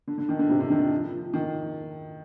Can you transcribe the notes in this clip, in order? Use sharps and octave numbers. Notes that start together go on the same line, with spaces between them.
D3
D3
D#3
D3
C3
D3
D#3
F3
F3
F3
D#3